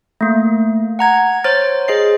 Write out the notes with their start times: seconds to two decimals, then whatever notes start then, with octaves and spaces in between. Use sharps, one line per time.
0.21 A3 A#3
0.99 F#5 A#5 G#6
1.44 C5 C#5 F6 A6
1.88 G#4 C5 D#5 C7